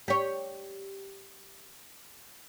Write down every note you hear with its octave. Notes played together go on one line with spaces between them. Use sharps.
G4 C#5